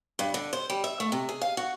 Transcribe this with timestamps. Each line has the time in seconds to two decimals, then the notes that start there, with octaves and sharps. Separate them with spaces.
0.19 G2
0.34 D3
0.53 C5
0.70 G3
0.84 E5
1.00 A3
1.12 C3
1.29 G#4
1.41 F5
1.57 F#4